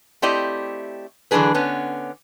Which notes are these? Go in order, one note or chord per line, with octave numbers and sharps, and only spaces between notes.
A3 C4 E4 G4 D5 D#5
D3 E3 F#3 D4 G#4 B4
D3 B3 C#4